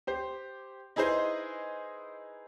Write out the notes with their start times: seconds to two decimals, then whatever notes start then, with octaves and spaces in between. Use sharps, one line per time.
0.07 G4 C5
0.96 D#4 E4 G#4 B4 C5 D#5